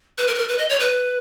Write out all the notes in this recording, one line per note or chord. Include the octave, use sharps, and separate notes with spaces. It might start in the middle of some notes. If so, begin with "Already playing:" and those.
B4
A#4
B4
A#4
B4
D#5
C#5
B4